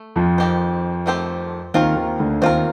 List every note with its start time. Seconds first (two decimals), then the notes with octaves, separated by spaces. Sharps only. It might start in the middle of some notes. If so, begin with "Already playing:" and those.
Already playing: A3
0.16 F2 F3
0.38 D#3 A3 C4 G4 C5
1.06 D#3 A3 C4 G4 C5
1.74 D#2 D#3 C4 F4 A#4
1.96 D#2 D#3
2.20 D2 D3
2.42 D#2 D#3 C4 F4 A#4